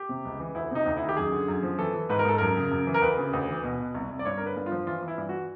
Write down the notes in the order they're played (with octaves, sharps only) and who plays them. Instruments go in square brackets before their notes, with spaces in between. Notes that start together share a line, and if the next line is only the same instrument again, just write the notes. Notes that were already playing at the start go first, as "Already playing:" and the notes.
Already playing: [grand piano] G4
C3
C#2
E3
D2 E4
C3 D#4
D2
D#3 E4
G4
F#2 G#4
D3
F#2
F3
E3 A4
E3
G#2 B4
A#4
G#2 A4
F#2 A#4
C#3
F#2
E3
A#4
D2 B4
C#3
D2
E3
B2
B2
C2
C2
D5
G2 C#5
D3 A#4
B4
G2
F4
F3
E3 F4
E3
E4
G2
F#4